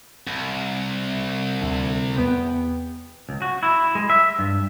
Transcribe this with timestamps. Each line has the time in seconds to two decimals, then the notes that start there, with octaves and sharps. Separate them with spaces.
0.27 C2
1.61 D2 D3
2.17 E2 B3 G5
3.29 C#2
3.42 F#4
3.63 E4
3.95 G#3
4.10 E5
4.39 G2